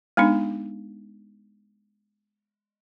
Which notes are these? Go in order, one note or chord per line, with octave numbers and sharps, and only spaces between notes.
G#3 B3 D4 D#4